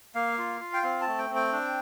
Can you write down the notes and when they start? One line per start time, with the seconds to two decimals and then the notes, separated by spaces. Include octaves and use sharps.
0.15 A#3 F5
0.38 F4
0.61 F4
0.73 G5
0.83 C4 F5
1.01 A5
1.07 A3
1.18 G5
1.30 C4
1.35 G5
1.53 D4